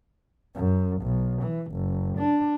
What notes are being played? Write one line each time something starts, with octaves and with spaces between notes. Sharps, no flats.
F#2
B1
E3
F#1
D4